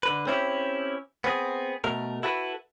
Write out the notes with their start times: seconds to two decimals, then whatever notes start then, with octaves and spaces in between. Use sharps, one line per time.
0.03 D3 B4
0.27 C4 C#4 E4 F4 G4
1.24 B3 C4 G#4
1.84 B2 A3 A#4
2.23 E4 F#4 A4 B4